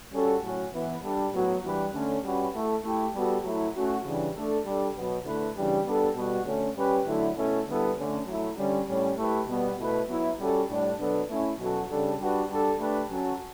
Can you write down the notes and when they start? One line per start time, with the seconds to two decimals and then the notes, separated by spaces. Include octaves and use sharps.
0.13 G3 C#4 F#4 A4
0.42 A2 F#3 C#4 F#4
0.74 E3 B3 E4 B4
1.03 G3 D4 A4
1.33 A2 F#3 B3 F#4
1.64 E3 G3 D4 G4 B4
1.94 D3 A3 C#4
2.24 G3 C#4 F#4 B4
2.54 A3 E4 A4
2.84 A3 E4 G4
3.15 G3 B3 F#4 A4
3.44 F#3 A3 E4
3.75 A3 C#4 F#4
4.05 C#3 E3 G3 D4
4.35 A3 D4 A4
4.65 G3 D4 A4
4.96 B2 F#3 B3
5.26 D3 A3 E4 B4
5.56 C#3 E3 G3 D4 G4
5.86 G3 B3 D4 A4
6.16 B2 G3 B3 F#4
6.46 D3 A3 C#4
6.77 G3 C#4 G4 B4
7.06 D3 F#3 A3 E4
7.37 B2 A3 C#4 E4 A4
7.68 D3 G3 B3 E4 A4
7.97 D3 A3 C#4
8.27 F#3 A3 E4
8.58 D3 G3 C#4
8.88 A2 G3 C#4
9.17 A3 E4 G4 B4
9.48 B2 G3 B3
9.79 B2 A3 E4 B4
10.09 F#3 B3 E4
10.39 G3 C#4 F#4 A4
10.69 A2 G3 D4
10.99 B2 F#3 B3 D4 A4
11.30 A3 C#4 E4
11.59 B2 F#3 C#4 F#4 A4
11.89 C#3 G3 D4 A4
12.19 G3 D4 F#4 B4
12.50 G3 D4 A4
12.80 A3 D4 G4 B4
13.10 F#3 C#4 F#4 A4